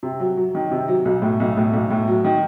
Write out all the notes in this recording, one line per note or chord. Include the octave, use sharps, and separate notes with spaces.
C3
F#3
F#3
D#3
C3
F#3
B1
A2
B1
A2
B1
A2
F#3
D#3